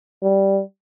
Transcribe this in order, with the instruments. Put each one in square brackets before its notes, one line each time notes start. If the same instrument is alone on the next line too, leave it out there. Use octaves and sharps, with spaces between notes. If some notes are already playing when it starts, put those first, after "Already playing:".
[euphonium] G3